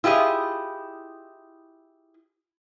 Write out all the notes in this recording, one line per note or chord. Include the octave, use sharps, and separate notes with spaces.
E4 F4 G4 G#4 D#5